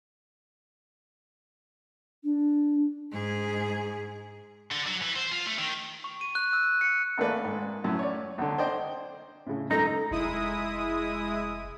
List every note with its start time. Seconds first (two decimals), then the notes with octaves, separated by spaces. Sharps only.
2.24 D4
3.12 G#2 G#4
4.72 D3
4.87 F#3
5.02 E3
5.16 C5
5.31 F4
5.46 A3
5.58 D#3
6.04 C#6
6.21 D#7
6.35 F#6
6.53 E6
6.81 C#7
7.18 G#1 A3 A#3 B4 D5
7.44 G#2
7.84 F#2 A2
7.99 C#5 D5
8.38 B1 D3
8.58 C5 D5 D#5 G5
9.46 A2 C#3
9.71 C#2 F#2 D#4 A4 A#4 A#5
10.11 F1 G#3 E4 D#6